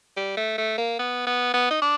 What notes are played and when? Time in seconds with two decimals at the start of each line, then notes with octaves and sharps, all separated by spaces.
0.17 G3
0.37 A3
0.58 A3
0.78 A#3
0.99 B3
1.27 B3
1.54 B3
1.71 D#4
1.82 D4